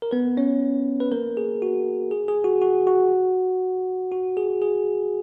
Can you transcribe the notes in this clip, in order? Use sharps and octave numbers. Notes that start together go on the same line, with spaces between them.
A#4
B3 B4
C#4 C#5
B4
A#3 A#4
G#4
F#4
G#4
G#4
F#4
F#4
F#4
F#4
G#4
G#4